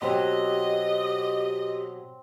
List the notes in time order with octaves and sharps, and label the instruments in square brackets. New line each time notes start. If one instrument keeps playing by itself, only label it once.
[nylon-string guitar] B2 F#3 [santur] C4 C6 [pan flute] G4 [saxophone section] D#5